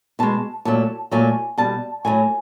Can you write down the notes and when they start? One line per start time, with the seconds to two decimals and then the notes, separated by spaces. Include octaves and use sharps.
0.19 B2 G#3 A5
0.65 A#2 F#3 A3 A5
1.11 A#2 F#3 A3 G#5
1.58 B2 G3 A5
2.05 A2 F#3 A3 G#5